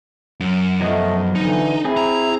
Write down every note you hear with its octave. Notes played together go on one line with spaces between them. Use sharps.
F#2
B2 F3 F#3 A3 D#5
D3 E3 D#4
C4 E4 G#4
A#5